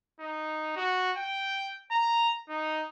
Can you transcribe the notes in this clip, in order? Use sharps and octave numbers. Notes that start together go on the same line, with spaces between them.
D#4
F#4
G5
A#5
D#4